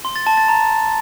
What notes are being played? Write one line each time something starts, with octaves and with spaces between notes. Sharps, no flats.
C6
A6
A5
A6
A#5